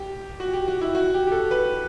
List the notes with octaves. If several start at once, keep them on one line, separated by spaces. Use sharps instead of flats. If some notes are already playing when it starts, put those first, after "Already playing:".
Already playing: G4
F#4
G4
F#4
E4
F#4
G4
G4
A4
B4